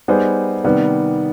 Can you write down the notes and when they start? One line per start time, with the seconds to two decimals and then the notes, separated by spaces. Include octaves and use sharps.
0.08 G3 B3 D#4 G#4 C5
0.64 C3 D#3 G3 B3